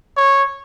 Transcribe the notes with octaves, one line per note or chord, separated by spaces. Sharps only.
C#5